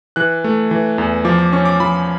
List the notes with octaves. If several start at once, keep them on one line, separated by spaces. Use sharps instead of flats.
E3 F#6
A3
E3
E2
F3 D6
D6
C#4 C#6
D6
F3 B5